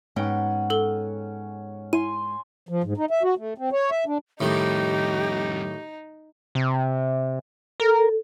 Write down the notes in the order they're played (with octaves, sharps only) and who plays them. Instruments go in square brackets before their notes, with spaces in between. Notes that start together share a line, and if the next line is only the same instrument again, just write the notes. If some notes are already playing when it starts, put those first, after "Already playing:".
[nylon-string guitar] G#2 B3 G5 [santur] C#4 F#5
[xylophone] A4 G7
[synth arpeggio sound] E4 [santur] G#5 C6 [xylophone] D#7
[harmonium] F3
G#2
D#4
E5
F#4
A3
C4
C#5
E5
D4
[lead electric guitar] F2 G3 [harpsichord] A2 D#3 [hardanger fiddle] D#4 [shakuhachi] G4
[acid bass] C3
[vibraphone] A4 [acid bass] A#4